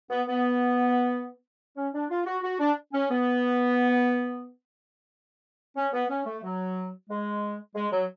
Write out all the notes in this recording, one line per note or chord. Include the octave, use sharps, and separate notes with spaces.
B3
B3
C#4
D4
F4
F#4
F#4
D4
C#4
B3
C#4
B3
C#4
A3
F#3
G#3
G#3
F#3